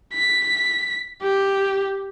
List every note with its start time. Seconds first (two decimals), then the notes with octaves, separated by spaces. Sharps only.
0.14 B6
1.22 G4